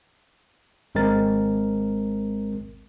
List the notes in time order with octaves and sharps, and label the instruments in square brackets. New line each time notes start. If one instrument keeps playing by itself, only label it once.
[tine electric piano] G#1 G#3 C4 A#4 A6